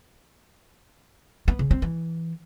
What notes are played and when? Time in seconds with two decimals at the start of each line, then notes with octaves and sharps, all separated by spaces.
1.48 B3
1.59 C#3
1.71 C4
1.82 E3